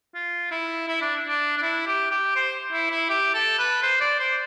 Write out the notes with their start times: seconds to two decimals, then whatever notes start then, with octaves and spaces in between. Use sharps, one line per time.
0.15 F4
0.51 E4
0.88 E4
1.01 D4
1.27 D4
1.57 D4
1.62 E4
1.87 G4
2.11 G4
2.36 C5
2.72 E4
2.91 E4
3.10 G4
3.34 A4
3.59 B4
3.83 C5
4.01 D5
4.20 C5